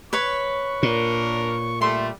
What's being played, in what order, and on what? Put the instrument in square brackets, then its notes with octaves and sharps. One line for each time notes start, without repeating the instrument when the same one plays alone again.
[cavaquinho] B4 C#5 [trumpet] C#6
[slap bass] A#2 [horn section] D4 A#4
[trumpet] G3 [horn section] A3 [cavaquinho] C6